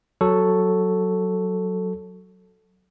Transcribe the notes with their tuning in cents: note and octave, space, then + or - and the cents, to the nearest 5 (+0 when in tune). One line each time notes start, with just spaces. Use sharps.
F#3 +0 A4 +0 C#6 +0